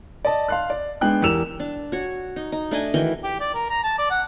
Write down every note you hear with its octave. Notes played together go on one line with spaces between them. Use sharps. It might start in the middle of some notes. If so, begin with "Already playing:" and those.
D5 D#5 A5
F5 C6 F#6
D5
G#3 B3 D4 G5 F#6
E2 G4 A#4 E6 E7 F7
D4
F#4 C#5
D#4
D#4
A3 D4 D#5 G#5
D#3 E3 F#4 G5
G4
D5
A#4
A#5
A5
D5
F#5